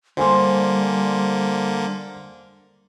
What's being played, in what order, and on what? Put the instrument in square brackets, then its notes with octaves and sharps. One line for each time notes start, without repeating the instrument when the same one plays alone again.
[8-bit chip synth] D3 A#3 [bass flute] G3 [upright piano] C5 G#5 C6